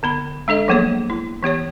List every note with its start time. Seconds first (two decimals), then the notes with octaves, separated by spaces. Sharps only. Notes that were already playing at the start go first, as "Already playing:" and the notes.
0.03 D3 B3 B5
0.48 G#3 D4 A4 D#5
0.68 F3 F#3 A#3 B3 G#4 C#5
1.10 E4
1.43 E3 B3 G4 C#5